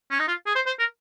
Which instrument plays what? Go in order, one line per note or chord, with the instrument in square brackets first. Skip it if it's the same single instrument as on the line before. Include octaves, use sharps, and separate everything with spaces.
[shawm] C#4
D#4
F4
G#4
C5
C5
A#4